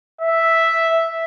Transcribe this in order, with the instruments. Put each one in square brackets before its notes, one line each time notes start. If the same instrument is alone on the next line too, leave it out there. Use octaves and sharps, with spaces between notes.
[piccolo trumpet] E5